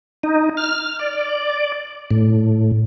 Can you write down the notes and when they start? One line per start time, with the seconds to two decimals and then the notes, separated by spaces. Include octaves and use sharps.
0.23 D#4
0.57 F6
0.99 D5
2.11 A2